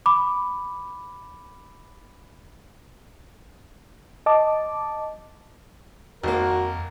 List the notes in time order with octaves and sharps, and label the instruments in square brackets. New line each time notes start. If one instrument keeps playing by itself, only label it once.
[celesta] B5 D6
[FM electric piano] D#5 A5 D6
[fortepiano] G#1 A#3 [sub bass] F2 [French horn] F#4 [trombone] A#4